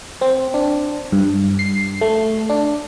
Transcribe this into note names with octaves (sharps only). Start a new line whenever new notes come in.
C4
D4
G2
C7
A3
D4